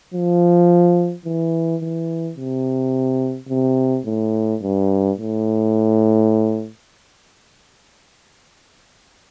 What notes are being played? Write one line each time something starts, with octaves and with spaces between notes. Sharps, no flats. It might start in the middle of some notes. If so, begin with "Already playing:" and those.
F3
E3
E3
C3
C3
A2
G2
A2